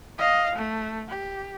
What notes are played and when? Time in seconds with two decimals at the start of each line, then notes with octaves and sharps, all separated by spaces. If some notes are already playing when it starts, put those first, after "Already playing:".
0.18 D#5 F5
0.55 A3
1.08 G4